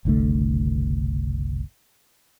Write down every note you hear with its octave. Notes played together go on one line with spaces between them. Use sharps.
F#1 C2 D3 A3